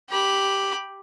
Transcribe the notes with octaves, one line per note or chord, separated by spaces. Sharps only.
G4 B5